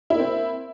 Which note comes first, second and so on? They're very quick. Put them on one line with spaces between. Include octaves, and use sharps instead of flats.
E4 A#3 C4